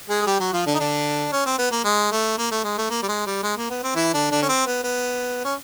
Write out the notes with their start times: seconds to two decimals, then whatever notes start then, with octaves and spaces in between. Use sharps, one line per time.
0.09 G#3 G#4
0.22 G#4
0.27 G3 G4
0.40 F#3 F#4
0.53 F3 F4
0.66 D3 D4
0.75 D#4
0.80 D3 D4
1.32 C#4
1.46 C4
1.58 B3
1.71 A#3
1.85 G#3
2.12 A3
2.38 A#3
2.51 A3
2.64 G#3
2.78 A3
2.90 A#3
3.02 G3
3.08 G#3
3.26 G3
3.43 G#3
3.57 A#3
3.70 B3
3.83 C4
3.95 E3 E4
4.14 D3 D4
4.31 D3 D4
4.42 C#4
4.49 C4
4.66 B3
4.84 B3
5.45 C#4